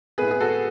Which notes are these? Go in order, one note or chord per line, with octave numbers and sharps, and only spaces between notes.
A2 G#3 B3 G#4 B4
G#4
F#4 A4